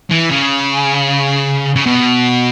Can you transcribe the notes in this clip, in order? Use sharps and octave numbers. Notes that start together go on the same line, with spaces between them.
E3
C#3
C#3
B2